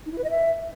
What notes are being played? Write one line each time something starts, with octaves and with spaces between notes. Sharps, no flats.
D#4
E4
B4
D#5
E5